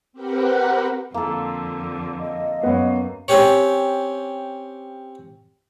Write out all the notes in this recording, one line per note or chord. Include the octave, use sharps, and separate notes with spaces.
C4 G4 A#4 B4 F#5
F2 D3 A#3 A4
D#5
F#2 B3 C#4
C4 C#4 G4 C#5